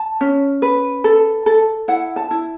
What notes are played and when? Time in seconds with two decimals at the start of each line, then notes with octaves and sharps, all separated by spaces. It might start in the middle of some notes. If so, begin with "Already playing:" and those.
Already playing: A5
0.21 C#4
0.62 B4
1.04 A4
1.46 A4
1.88 E4 F#5
2.16 A5
2.31 E4